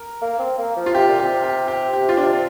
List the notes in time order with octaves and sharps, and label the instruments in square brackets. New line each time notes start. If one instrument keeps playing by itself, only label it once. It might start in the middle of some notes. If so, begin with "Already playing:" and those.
Already playing: [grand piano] A#4
[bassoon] A#3
C4
A#3
F3
[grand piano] F4
[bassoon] C3 [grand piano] G4
[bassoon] A#2
[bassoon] C3 [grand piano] G4
[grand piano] G4
G4
G4
F4
D4
[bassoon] C4